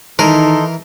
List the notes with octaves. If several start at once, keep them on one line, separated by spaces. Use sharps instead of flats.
D#3 E3 D#4 A4 A#4 C6